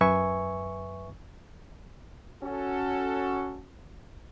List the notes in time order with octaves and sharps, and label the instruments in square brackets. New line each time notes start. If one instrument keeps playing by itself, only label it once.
[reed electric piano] F#2 B4 E5 G#5 C#6
[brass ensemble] C#4 F#4 A4